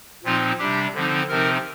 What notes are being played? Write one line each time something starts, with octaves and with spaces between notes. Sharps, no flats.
A#2 F3 C4 D#4 F4
C3 G3 D4 G4
D3 F3 C4 D#4
C3 F3 C4 D#4 A#4